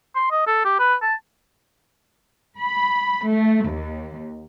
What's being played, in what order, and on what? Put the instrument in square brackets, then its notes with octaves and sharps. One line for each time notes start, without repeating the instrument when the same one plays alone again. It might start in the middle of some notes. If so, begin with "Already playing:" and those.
[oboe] C6
D#5
A4
G4
B4
A5
[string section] B5
A3
D#2